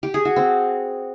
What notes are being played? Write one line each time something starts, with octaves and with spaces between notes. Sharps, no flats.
G4
G#4
F#4
C4